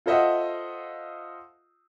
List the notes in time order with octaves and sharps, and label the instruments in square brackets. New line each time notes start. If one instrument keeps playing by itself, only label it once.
[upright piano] F4 A4 C5 D#5 E5 F#5